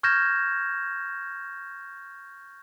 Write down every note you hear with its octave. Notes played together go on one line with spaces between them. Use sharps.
C#6 F6 G6 G#6 A#6 E7